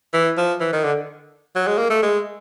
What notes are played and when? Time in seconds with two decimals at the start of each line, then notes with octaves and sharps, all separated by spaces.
0.13 E3
0.37 F3
0.60 E3
0.73 D#3
0.84 D3
1.56 F#3
1.67 G#3
1.78 A#3
1.90 A3
2.03 G#3